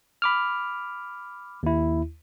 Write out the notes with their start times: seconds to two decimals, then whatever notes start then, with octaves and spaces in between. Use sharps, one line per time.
0.22 B5 D6 F6
1.63 D#2 E4